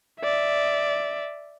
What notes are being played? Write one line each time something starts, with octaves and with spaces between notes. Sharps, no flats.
D5 E5